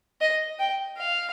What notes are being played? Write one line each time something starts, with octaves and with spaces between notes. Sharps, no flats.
D#5
G5
F5